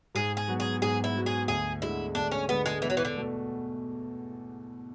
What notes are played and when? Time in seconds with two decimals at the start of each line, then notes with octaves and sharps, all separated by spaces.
0.15 G#2 G#4
0.37 G#4
0.48 F#3 B3 F#4
0.60 G#4
0.82 G#2 G#4
1.04 E4
1.15 F#3 B3 F#4
1.26 G#4
1.48 D2 G#4
1.82 D3 G#3 E4
2.15 D2 D4
2.32 C#4
2.48 D3 G#3 B3
2.66 G#3
2.82 E2 E3
2.90 F#3
2.97 E3
3.05 D3
3.16 B2 A3